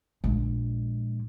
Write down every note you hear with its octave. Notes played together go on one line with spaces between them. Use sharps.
A#1 G#3